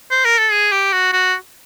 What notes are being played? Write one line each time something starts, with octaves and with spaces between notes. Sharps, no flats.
C5
A#4
A4
G#4
G4
F#4
F#4